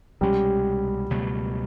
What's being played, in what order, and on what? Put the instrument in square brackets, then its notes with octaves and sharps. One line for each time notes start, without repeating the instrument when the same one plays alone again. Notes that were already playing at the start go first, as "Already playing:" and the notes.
[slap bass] C2 B2 G#3 C#4 [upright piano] G3
[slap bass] C#2 B2 F#3 A3